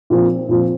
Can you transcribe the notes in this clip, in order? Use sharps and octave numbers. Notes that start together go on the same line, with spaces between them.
A#2 F3 C4
A#2 F3 C4